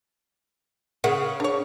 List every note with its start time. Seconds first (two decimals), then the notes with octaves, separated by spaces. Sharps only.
1.04 C#3 A#4 E5 F#5
1.40 D4 C#5